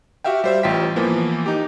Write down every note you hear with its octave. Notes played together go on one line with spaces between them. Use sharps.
F#4 G4 E5 F5 G5
G3 C5 E5
A1 F4 G5 B6
E3 F3 A#3 B3
D#4 G4